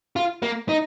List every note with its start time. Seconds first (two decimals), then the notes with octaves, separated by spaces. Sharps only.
0.16 F4
0.43 A#3
0.69 D#4